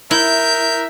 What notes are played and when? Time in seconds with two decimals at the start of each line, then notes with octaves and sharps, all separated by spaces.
0.11 E4 A#4 E5 G6